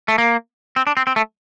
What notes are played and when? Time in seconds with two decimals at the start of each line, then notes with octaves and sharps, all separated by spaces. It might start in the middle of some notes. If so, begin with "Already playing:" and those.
0.08 A3
0.18 A#3
0.76 C4
0.87 D4
0.97 C4
1.07 C4
1.16 A3